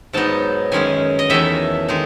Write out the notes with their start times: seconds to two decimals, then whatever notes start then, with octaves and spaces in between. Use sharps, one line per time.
0.13 G#2 F#3 B3 D#4 A5
0.72 F#2 D#3 G#3 C#4 G#5
1.19 D#5
1.30 E2 D#3 F#3 A3 E5
1.88 D#3 G#3 D#4